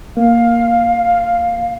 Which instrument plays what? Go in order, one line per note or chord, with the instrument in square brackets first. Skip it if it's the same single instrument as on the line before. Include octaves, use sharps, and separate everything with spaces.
[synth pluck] A#3 [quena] F5